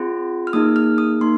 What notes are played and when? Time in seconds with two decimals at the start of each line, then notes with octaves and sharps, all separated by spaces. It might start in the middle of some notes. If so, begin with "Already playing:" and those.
Already playing: C4 F4 G#4 C6
0.47 F6
0.53 A#3 D#4 G#4 D#6
0.76 F6
0.98 D#6
1.21 A#3 D#4 C6